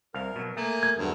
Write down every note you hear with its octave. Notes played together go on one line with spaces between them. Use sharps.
C2 A#4 F5
B2 F#3
A3 A#3 G#5 D#6
G#6
E2 G2 D3 F#3